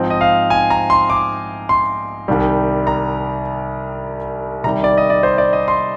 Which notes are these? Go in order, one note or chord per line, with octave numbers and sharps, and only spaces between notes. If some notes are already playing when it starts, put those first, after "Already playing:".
Already playing: G#2 F3 C4 D#4
D#5
F5
G#5
A#5
C6
D6
C6
C2 C3 D#3 G3
A#5
C3 D#3 G3 A#5
D5
D#5
D5
C5
D5
D#5
C6